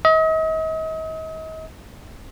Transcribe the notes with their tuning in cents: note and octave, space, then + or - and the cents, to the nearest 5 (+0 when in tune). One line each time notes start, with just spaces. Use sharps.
D#5 +40